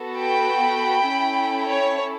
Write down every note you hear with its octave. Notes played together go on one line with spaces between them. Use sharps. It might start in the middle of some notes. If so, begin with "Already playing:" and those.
Already playing: B3 F#4 A4
G5 B5
C#4 E4 A4
C#5